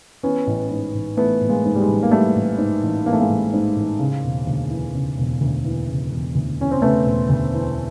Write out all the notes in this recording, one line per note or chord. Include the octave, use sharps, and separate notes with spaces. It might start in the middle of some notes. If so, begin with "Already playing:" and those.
E3 B3 C#4
A1
G#2
A1
E3 A3 B3
A1
G#3 A#3
G#2
G3
G#3
A1
A#3
E3 G3 A3
A1
G#2
A1
E3 A#3
A3
G#3 A#3
A1
G#2
A1
C#3
E1
D2
E3
C#3
E1
D2
E3
C#3
E1
D2
E3 C#4
C4
C#3 A3 B3
E1
D2
E3